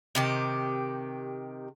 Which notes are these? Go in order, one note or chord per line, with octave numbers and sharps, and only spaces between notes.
C3 D#3 G4